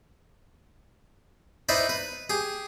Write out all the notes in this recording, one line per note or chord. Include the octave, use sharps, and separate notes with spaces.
D#4 E4 B4 C5 D5
B4
G4 G#4